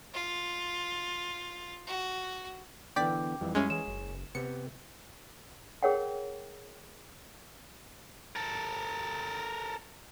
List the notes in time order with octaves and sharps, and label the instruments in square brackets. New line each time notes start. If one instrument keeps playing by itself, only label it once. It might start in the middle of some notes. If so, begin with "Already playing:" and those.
[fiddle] F4
F#4
[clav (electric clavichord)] D3 E3 [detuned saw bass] B3 [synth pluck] D5 B6 [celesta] G5 D6 G6
[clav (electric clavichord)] F2 E3 [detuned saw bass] G3
[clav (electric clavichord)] F#2 E4 E5 [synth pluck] G#3 C#4
[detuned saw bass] E3 [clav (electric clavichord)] G#4 C#5 [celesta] E7
[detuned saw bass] F#1
[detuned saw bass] C3 [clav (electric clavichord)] B3 C4 G4 [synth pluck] C#7
[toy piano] G#4 A#4 C#5 F#5 G5
[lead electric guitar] A4 A#4